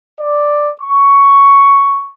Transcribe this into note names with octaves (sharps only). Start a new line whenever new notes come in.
D5
C#6